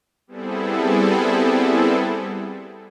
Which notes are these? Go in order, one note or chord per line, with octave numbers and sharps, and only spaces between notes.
G3 B3 C4 E4 G#4 A4